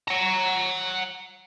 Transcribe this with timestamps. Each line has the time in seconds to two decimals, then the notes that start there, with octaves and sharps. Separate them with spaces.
0.08 F#5 A#5